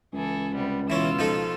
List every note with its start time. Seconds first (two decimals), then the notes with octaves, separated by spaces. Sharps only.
0.13 C#2 E3 G#4 A4
0.54 C3 G3 B3
0.90 B2 E3 C#4 F4 E6
1.19 F3 D#4 A4